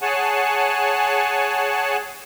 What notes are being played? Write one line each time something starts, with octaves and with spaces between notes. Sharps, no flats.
G#4 C#5 F#5 G#5 A5